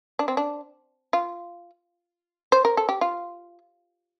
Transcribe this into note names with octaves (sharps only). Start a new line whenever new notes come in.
D4
C4
D4
F4
C5
A#4
A4
G4
F4